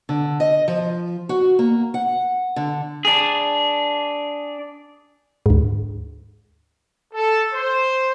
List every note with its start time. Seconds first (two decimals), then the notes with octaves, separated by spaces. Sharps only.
0.09 D3
0.40 D#5
0.68 F3
1.29 F#4
1.59 A#3
1.94 F#5
2.56 D3
3.05 D4 G#4
5.46 D2 G#2
7.13 A4
7.54 C5